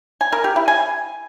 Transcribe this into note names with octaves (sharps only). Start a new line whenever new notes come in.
G#5
A#4
G4
E4
G#5